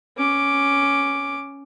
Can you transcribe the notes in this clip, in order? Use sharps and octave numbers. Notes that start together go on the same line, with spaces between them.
C#4 D6